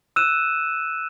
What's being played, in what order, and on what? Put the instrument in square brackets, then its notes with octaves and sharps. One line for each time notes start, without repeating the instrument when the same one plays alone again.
[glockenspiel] E6 F#6 D#7 E7